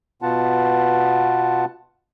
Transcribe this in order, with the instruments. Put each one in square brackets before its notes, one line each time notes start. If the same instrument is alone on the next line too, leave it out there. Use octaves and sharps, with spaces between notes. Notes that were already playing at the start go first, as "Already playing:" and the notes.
[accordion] B2 B3 F4 F#5 A5